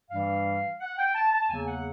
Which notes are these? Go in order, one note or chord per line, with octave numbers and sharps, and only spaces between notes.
G2 E3 G3 F5
F#5
G5
A5
A5
E2 C#3 F#3 A#3 G#5
F#5